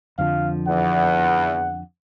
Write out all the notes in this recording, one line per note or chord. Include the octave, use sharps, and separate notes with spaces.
F2 D3 F3 F5
E2 F#5